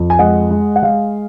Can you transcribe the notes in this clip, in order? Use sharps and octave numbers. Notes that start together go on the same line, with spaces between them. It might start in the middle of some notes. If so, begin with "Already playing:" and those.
Already playing: F2
G#5
G#3 D#5 F#5
G#3
F#5
G#3 F5